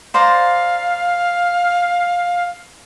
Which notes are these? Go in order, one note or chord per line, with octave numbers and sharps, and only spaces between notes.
C5 D5 F5 A#5